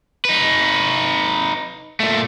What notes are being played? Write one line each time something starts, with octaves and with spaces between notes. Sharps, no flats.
D#4 B4
A#2 A3